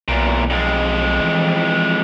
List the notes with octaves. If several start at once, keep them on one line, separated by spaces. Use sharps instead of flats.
B1 E2 A#2
F2 G#3
E3